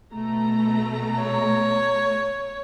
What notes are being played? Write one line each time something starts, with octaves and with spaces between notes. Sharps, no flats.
B2 A3 A#5
C#5